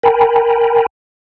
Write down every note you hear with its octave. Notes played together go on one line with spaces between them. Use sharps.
A#4 G5 G#5 A#5 B5